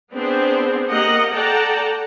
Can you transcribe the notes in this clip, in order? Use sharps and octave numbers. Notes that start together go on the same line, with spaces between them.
B3 C4 D4 G#4
A#3 G4 A#4 D#5 F#5
A4 D5 F#5 G5 A5 A#5